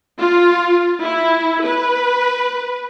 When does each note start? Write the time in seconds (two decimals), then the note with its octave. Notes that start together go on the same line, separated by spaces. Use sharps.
0.18 F4
1.02 E4
1.65 B4